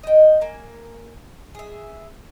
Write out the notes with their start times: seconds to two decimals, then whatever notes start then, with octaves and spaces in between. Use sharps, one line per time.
0.03 D#5 G5
0.41 A#3 G#5
1.55 G#4 E5